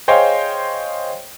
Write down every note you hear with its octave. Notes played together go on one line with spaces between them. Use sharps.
G#4 C5 C#5 D#5 F5 G5